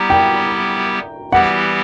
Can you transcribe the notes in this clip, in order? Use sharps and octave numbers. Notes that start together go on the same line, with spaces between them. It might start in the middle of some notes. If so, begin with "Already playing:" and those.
Already playing: G3 B3 E4 G4 A#5
G5
E3 G3 B3 E4 G4 F#5